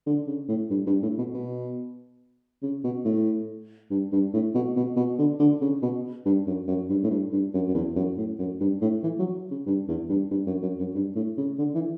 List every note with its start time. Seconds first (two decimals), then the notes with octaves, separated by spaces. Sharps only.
0.07 D3
0.28 C#3
0.49 A2
0.70 G2
0.87 G2
1.03 A2
1.18 B2
1.34 B2
2.63 C#3
2.84 B2
3.05 A2
3.91 G2
4.12 G2
4.34 A2
4.55 B2
4.76 B2
4.97 B2
5.19 D3
5.40 D3
5.62 C#3
5.82 B2
6.25 G2
6.47 F#2
6.68 F#2
6.89 G2
7.04 A2
7.11 G2
7.32 G2
7.54 F#2
7.68 F#2
7.75 E2
7.96 F#2
8.18 A2
8.39 F#2
8.60 G2
8.81 A2
9.03 E3
9.19 F#3
9.51 C#3
9.67 G2
9.88 E2
10.09 G2
10.31 G2
10.47 F#2
10.63 F#2
10.79 F#2
10.95 G2
11.16 A2
11.38 C#3
11.59 D3
11.75 E3